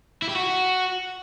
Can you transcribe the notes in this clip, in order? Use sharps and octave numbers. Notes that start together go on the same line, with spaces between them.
E4
G4
F#4